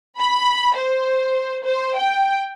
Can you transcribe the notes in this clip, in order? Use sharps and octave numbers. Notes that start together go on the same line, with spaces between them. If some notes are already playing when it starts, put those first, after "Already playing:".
B5
C5
C5
G5